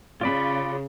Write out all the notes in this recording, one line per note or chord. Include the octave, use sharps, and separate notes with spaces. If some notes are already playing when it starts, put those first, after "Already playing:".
C#3 F4 D5 B5